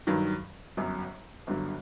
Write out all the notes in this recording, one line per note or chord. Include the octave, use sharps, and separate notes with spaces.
G2 D#3 F#3
G1 F#2 F#3
G1 G2 D3 F#3